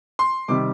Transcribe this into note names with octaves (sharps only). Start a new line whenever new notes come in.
C6
C3 D#3 G3 D6